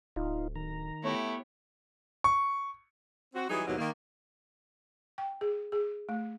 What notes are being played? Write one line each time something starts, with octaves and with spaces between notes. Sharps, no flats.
D1 D#4 F4
D#3 A#5
A3 B3 E4 G4 C#5
C#6
C4 F#4
E3 F#3 G3 D#4 G#4
D#2 G#2 B2 E3 F#3 A#3
D#3 A#3
G5
G#4
G#4
A3